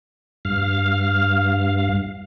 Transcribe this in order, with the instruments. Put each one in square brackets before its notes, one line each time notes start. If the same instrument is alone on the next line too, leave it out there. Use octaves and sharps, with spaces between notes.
[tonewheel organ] G2 F5